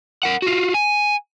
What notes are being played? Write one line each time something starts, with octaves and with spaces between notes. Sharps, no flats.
A#4 F#5
F4 F#4
G#5